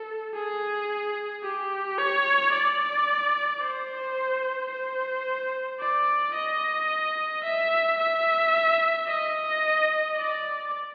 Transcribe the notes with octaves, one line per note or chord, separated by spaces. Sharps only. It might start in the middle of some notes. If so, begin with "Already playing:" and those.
Already playing: A4
G#4
G4
C#5
D5
C5
C5
D5
D#5
E5
E5
D#5
D5